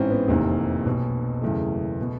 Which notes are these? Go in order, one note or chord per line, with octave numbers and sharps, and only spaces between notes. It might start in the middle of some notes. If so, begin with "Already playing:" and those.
Already playing: A1 G#2 E3 C4 C#4
B3
F1 E2 C3 D#3 A#3
B1 B2
F#1 E2 C#3 E3 A3
B2